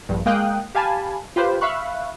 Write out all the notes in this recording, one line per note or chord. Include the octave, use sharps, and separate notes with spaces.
A#1 G2
G#3 A#3 F5 G5 D#6 F#6
G4 F5 G#5 A5 B5
F4 G4 B4 C5
E5 F5 B5 C#6 F#6